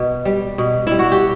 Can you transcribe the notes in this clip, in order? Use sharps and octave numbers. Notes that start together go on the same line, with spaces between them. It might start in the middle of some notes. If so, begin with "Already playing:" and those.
Already playing: B2 B4
G3
B2
G3 E4
F#4
G4